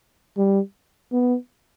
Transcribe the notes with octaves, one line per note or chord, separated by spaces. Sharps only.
G3
B3